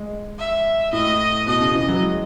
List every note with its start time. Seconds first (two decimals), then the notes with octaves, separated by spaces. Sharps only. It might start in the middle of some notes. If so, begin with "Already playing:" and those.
Already playing: G#3
0.39 E5
0.93 A2 D#5
1.47 B2 D#5
1.61 C#3
1.75 E3
1.89 F#3
2.02 G#3